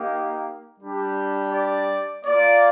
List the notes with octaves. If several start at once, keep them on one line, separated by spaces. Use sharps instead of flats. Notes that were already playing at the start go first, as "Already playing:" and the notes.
Already playing: A#3 D#4 G4
G3 D4 G4
D5
A#3 F4 D5